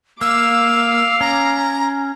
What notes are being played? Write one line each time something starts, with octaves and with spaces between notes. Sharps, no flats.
A#3 F5 D6 E6
C#4 A#5